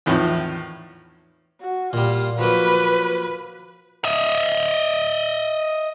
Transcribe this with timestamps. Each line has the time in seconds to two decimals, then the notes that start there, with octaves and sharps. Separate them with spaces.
0.06 E2 A2 D#3 F3
1.61 F#4
1.93 A#2 G3 F4
2.39 F3 F#3 A#3 B4
4.04 D#5 E5